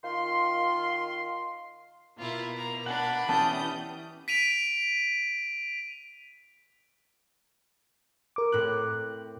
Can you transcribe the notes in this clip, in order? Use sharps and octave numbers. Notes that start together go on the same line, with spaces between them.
D#3 F4 F5 C6
B2 A#3 E4 F4
A#5
D4 F#5 B5
E3 B3 C#4 G4 A5 D#6 G6
B6 D7 D#7 F7
A#4 D6
A2 C4 F#6